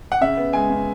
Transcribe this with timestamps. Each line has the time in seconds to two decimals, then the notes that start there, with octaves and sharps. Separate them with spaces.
0.12 F#5
0.21 C#3 E5
0.37 B3
0.53 G#3 G#5
0.70 C#3